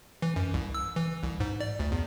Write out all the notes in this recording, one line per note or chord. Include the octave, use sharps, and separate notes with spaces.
E3
F#2
C2
E6
E3
C2
G#2
D5
D2
E2